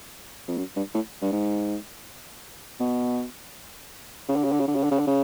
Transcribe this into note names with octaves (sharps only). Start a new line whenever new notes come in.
F2
F#2
G2
A2
G2
G#2
B2
C#3
D3
C#3
D3
C#3
D3
C#3
D3
C#3
D3
C#3